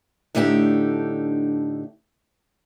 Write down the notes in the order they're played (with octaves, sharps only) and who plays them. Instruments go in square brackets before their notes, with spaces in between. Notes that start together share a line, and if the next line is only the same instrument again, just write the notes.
[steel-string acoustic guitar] A2 D3 A3 D4 D#4 G4